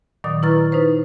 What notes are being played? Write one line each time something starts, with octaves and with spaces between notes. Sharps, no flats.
A#2 D#3 F#3 D5 D#6
E4 B4 A#5 C#6 F6 A6
D#4 B4 C5